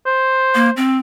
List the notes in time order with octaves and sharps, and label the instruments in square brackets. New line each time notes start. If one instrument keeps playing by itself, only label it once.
[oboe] C5
[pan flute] A#3
C4